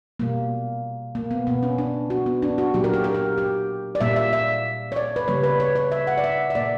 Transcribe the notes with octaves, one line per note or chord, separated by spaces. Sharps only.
B2 G3 A#3
A#3
B3
B2 A#3 B3
C#4
D4
F#4
B3
D4
F#4
A#2 F#3 A#3 G4
A#4
G4
A#4
G4
G4
D5
A#2 G3 A#3 E5
E5
E5
C#5
D5
B4
C#3 G3 A#3 C#5
B4
C#5
C#5
E5
F#5
D5
E5
E5
A#2 A#3 D5